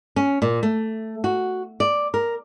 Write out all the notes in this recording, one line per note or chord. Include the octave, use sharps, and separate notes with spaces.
C#4
A#2
A3
F#4
D5
A#4